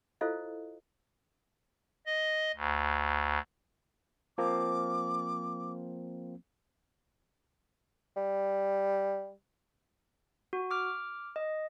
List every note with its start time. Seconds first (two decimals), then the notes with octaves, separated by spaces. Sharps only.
0.21 E4 F4 A4 C5 D#5 F5
2.07 D#5
2.56 D2
4.38 F3 A#3 C4 D6
8.17 G3
10.53 F#4
10.71 D6 F6
11.36 D#5